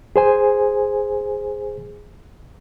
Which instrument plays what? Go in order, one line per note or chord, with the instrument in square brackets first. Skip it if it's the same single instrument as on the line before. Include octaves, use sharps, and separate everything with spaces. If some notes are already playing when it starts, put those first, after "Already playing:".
[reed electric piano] G#4 C5 G#5